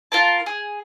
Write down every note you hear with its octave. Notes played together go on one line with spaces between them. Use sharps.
F4 A#4 A5
G#4